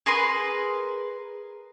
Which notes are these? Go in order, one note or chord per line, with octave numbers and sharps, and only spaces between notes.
G#4 A#4 B4 C6